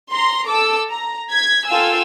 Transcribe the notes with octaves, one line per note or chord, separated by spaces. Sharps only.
A#5 C6
A4 D6 E6
A#5
G#6 B6
F4 A4 F5 G5 G#5 E6